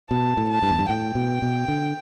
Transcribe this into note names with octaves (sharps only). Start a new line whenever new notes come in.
B2 A5
A2
A5
G2
E2
G2
A2 G5
B2
B2
D3